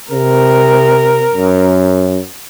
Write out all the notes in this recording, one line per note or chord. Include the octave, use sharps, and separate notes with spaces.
C3 A#4
F#2